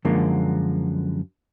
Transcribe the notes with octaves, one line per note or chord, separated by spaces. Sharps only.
F#2 D3 F3 F#3 G#3 A#3